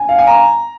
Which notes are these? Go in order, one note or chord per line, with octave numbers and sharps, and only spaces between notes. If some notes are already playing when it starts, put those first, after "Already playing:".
Already playing: G#5
F5
G#5
A#5